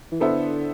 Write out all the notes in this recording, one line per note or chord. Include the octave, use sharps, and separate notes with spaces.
E3
D3 B3 E4 A4 C5 E5